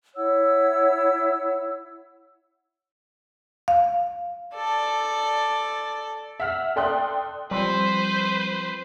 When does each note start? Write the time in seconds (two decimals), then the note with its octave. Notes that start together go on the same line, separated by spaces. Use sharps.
0.16 E4 C#5 F#5 E6
3.68 F5
4.53 A4 D5
6.40 E5 F#5 F6
6.76 A4 D5 G5 C6 D#6 F#6
7.51 F3 G3 C4 B4 C5